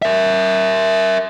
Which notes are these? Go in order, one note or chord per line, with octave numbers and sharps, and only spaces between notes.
A#4 E5